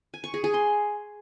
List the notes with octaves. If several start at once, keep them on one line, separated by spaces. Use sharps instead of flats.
G#5
C#6
G#4
G#4
C6